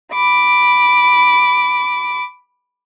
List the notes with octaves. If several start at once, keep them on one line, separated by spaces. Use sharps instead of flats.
B5 D6